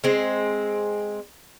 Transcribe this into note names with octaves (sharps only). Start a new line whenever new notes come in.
G#3 C4